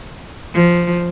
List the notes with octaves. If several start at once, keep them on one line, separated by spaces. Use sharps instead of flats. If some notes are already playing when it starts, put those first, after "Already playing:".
F3